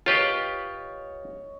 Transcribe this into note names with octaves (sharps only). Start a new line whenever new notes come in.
F4 G4 B4 C#5 D#5